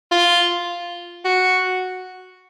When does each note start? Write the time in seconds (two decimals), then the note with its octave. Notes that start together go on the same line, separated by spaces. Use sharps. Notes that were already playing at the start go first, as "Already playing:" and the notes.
0.12 F4
1.25 F#4